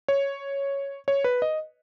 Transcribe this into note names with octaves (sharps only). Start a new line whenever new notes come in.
C#5
C#5
B4
D#5